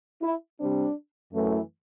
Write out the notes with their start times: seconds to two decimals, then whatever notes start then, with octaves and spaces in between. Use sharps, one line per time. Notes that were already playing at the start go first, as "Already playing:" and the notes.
0.22 E4
0.59 C3 G3 C4 D4
1.33 F#2 E3 A3